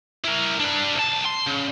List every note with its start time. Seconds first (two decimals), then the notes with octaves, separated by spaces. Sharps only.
0.25 E4 A#4
0.60 D4 B4
0.95 C2 A5
1.25 C6
1.47 C#3